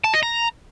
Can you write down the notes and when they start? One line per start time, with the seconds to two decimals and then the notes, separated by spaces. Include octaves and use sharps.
0.04 A5
0.14 D#5
0.23 A#5